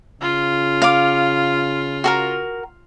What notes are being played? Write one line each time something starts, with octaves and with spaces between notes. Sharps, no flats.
C#3 F4
F5 D6
F#4 A4 A#4